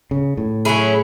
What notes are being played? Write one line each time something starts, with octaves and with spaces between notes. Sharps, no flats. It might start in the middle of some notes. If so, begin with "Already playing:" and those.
C#3
A2
F#3 C#4 E4 G#4